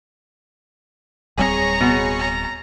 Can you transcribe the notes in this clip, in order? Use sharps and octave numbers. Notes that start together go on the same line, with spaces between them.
D1 G3 C4 G#4 C#5 A#5 C#7
B2
A#5